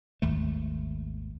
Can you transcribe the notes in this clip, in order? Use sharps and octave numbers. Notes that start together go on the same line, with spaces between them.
G#1 D#2 A3